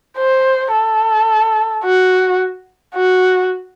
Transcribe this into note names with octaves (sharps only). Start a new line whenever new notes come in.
C5
A4
F#4
F#4